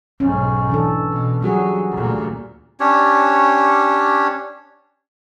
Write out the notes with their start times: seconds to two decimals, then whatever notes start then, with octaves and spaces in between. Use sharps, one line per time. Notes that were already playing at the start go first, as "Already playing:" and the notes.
0.20 B1 G#2 C#4
0.69 E3 D4 A4
1.11 B2
1.42 F#3 G3 F#4 G#4
1.92 D2 A#2
2.80 C#4 D4 G4 C#5